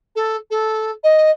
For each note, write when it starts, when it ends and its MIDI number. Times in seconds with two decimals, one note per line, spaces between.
0.15 0.36 69
0.50 0.91 69
1.03 1.31 75